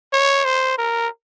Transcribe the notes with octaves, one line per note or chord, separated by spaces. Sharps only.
C#5
C5
A#4